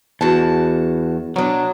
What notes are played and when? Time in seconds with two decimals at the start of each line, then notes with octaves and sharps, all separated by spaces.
0.21 E2 F#4 A5
1.36 B2 F#3 D4